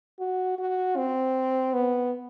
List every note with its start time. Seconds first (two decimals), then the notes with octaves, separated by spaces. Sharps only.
0.20 F#4
0.59 F#4
0.97 C4
1.74 B3